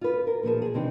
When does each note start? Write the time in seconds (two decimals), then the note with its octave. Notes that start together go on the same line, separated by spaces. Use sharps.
0.01 F4 B4
0.27 A#4
0.43 A#2 F3 G#4 A5
0.62 G#4
0.74 C3 D#3 E3 C4 D4